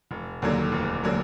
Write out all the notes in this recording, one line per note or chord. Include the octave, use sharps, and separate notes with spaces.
F1
D#2 D3 F#3 A#3
F1
D3 F#3 A#3